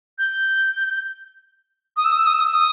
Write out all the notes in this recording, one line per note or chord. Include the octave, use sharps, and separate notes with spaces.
G6
D#6
E6
D#6
E6
D#6
E6
D#6
E6
D#6